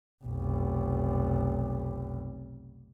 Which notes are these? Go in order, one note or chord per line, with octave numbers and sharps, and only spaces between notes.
F1 B1